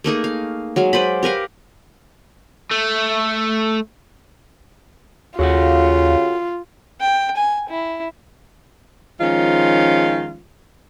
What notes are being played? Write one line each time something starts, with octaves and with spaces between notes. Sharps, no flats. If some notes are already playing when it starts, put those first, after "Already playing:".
A3 A#3 D#4 G#4
F5
F#3 G#3 F5
B4 C5 D5 B5
G4 A#4 B4 F5
A3
D#2 C#3 F4 F#4 A4 F#5
G5
G#5
E4
D#3 F3 G#3 C#4 F4